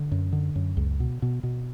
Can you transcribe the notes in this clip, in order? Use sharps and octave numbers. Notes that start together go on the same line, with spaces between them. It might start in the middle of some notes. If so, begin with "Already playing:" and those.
Already playing: D3
F#2
D3
F#2
C#2
B2
B2
B2